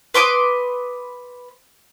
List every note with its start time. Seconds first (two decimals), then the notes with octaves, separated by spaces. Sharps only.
0.14 B4 C6 D6 D#6